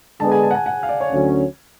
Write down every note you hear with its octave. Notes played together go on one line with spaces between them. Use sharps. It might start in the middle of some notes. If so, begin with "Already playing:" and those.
D3 G#3 B3 D4 G#4 A5
G#5
A5
F#5
G#5
F#5
F5
D5
C#5
D2 D3 F#3 C#4